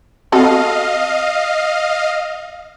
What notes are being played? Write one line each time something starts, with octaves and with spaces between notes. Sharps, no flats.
C4 F#4 A4 D#5 F5